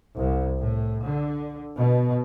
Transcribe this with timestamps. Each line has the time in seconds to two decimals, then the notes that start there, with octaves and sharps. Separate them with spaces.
0.17 C2
0.59 A2
1.03 D3
1.78 B2